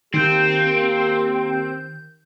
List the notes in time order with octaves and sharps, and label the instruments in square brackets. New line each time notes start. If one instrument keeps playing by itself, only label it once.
[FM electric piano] D#3 G6 [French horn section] A#3 [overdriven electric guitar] C4 [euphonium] G4